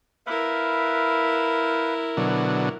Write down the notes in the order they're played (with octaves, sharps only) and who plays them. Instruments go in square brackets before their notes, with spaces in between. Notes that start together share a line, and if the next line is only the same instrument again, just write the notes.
[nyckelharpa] E4 A#4 [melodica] B4 E5 F5
[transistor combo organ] B2 D3 F#3